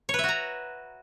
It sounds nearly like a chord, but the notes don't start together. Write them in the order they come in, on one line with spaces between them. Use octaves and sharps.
C#5 B4 E5 F#4 A#5